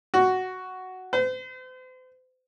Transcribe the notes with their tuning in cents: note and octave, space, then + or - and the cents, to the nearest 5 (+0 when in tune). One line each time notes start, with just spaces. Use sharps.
F#4 +5
C5 -40